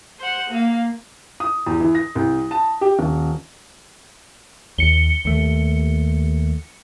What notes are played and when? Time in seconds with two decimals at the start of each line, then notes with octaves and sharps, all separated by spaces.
0.19 C5 F#5
0.50 A#3 F5
1.40 D#6
1.66 E2
1.80 E3
1.95 A#6
2.15 C2
2.51 A5
2.81 G4
2.99 D#1
4.78 D#2 C#7 G7
5.25 D#2 A3